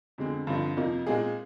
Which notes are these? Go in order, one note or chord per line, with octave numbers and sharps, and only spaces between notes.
F2 D3 G#3 C4
G2 D3 F3 C4 D#4
F2 C3 F3 A#3 D#4
A#2 G#3 C4 D#4 G#4